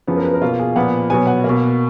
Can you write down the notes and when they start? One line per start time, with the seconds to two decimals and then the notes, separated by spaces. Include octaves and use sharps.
0.07 F#2 F3 B3 G#4
0.17 A#4
0.24 B4
0.34 A#4
0.42 B2 A#3 F4
0.60 G#4
0.76 A#2 F3 B3 F#5
1.10 B2 F#3 B3 G#5
1.27 F#5
1.44 B2 A#3